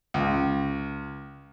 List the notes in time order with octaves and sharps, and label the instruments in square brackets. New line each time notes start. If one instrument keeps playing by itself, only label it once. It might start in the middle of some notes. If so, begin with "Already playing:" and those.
[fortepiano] C#2